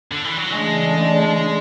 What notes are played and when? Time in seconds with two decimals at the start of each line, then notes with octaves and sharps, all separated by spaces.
0.12 D3
0.25 E3
0.37 F#3
0.50 C#3 E3 G#3 A3 D4